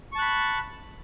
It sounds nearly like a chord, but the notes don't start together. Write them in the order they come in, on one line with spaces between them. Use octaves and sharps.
C#6 A5 F#6 B5